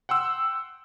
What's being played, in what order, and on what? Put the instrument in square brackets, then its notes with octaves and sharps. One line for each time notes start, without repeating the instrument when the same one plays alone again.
[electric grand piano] F#5 G5 C6 E6